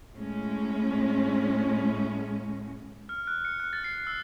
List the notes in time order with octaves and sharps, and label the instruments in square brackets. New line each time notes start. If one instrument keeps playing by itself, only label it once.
[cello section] A2 G#3 A3 C#4
[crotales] F6
F#6
C#7
F#6
A6
C7
E6